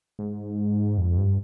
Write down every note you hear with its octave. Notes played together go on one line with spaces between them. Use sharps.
G#2
F2
G2